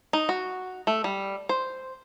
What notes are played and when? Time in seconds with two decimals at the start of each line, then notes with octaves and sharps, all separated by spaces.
0.13 D#4
0.29 F#4
0.87 A3
1.04 G3
1.49 C5